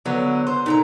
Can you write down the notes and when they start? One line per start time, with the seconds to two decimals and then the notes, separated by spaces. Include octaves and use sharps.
0.06 D3 F#3 B3
0.47 C5 C6
0.66 A#2 D3 D#4 A#5